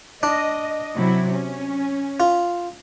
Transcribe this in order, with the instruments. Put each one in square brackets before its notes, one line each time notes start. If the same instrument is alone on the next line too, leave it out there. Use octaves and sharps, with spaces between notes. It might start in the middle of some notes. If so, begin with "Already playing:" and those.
[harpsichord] D4 [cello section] D#5
[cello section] C3 F#3 E4
C#4
[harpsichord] F4